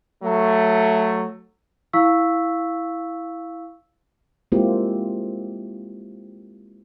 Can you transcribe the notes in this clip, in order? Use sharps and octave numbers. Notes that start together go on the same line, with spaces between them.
F#3 A3
E4 F5 C#6 E6 B6
G#3 A#3 C4 E4 F4 G4